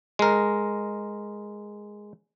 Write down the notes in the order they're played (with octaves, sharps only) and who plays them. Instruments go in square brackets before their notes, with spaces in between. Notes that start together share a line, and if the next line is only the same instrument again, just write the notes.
[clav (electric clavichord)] G#3 A#4